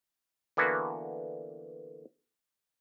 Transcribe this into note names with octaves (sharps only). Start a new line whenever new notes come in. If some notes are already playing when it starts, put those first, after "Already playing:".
D3 E3 A#3 B3 F#4